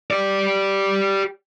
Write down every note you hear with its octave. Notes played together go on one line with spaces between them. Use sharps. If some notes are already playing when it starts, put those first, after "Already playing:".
G4 D5